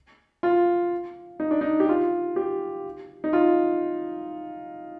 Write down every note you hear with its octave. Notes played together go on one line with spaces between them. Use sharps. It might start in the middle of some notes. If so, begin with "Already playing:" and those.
F4
D#4
D4
D#4
G4
F4
G4
D#4
F4